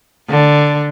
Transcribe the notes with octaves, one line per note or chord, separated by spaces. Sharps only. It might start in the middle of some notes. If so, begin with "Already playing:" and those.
D3